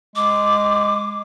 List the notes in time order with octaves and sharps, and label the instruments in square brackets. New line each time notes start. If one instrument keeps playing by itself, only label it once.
[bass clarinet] G#3 [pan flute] D6